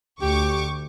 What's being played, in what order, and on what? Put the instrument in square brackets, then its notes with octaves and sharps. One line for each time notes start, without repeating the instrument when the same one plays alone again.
[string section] D2 C#6 D6 [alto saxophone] G4